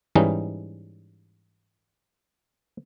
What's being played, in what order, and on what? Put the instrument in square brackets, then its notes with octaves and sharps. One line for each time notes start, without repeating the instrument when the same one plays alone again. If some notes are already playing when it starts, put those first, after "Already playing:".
[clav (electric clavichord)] G#2 E3 G3 C#4 D#4